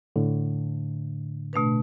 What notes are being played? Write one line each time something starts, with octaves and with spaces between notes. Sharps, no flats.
A2 D3
B2 A3 D4 B4